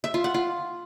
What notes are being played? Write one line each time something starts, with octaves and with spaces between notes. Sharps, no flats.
E5
F4
F#5
F4